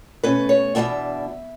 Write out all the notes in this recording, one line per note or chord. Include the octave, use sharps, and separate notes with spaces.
B2 A3 C#4 B4
C#5
E2 B2 G#3 D4 E5